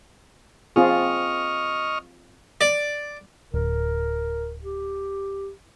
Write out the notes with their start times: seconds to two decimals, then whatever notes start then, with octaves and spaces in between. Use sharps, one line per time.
0.76 C4 F4 G#4 D#5 C#6 F6
2.61 D5
3.54 D1 A#4
4.63 G4